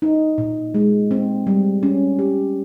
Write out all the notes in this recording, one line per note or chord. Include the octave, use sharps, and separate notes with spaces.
D#4
A#2
G#3
C4
G3
C#4
G4